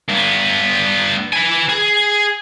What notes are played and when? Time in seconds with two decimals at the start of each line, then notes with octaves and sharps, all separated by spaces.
0.09 G2 B3
1.33 B4 G#5
1.69 G#4